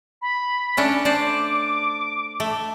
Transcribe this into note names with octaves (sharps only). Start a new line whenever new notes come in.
B5
A3 C#4 D4
D4 C5 D5 D6
A3